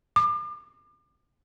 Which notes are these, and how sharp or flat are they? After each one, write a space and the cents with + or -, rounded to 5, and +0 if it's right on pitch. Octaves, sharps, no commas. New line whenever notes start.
D6 +40